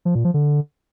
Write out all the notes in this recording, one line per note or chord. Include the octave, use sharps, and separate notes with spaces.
F3
A#2
F3
D3